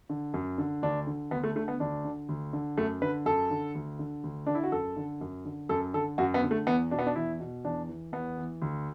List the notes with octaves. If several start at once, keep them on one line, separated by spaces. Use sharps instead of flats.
D3
F#2
D3
D2 D4
D3
D2 B3
A3
D3 A3
B3
D2 D4
D3
D2
D3
F#2 A3
D3 B4
F#2 A4
D3
D2
D3
D2
D3 D4
E4
F#4
F#2 A4
D3
F#2
D3
F#2 A4
D3 A4
F#2 F#4
B3
D3
A3
E2 B3
B2 D4
B3
D4
E2 E4
B2
E2 D4
E3
E2 B3
E3
D2